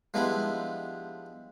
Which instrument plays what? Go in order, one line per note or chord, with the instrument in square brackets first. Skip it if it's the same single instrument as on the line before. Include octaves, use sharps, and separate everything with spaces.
[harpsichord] F3 G3 G#3 B3 D4 E4